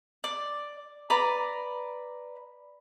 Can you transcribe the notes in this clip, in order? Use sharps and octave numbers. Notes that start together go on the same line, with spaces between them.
D5
B4 D5 A#5